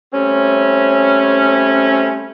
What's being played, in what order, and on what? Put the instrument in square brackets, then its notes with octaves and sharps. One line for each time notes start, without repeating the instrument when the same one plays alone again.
[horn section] G3 A3 C4 C#4